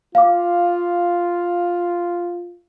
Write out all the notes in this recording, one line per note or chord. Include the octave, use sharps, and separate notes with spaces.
F4 F5 D6